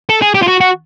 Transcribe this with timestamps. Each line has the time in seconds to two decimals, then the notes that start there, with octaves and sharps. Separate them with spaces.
0.09 A4
0.22 G#4
0.34 G4
0.42 F4
0.48 F#4
0.61 F#4